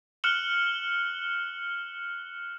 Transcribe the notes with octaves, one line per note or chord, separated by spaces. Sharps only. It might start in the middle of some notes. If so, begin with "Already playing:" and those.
F6 F#6 C#7 E7 F#7 G7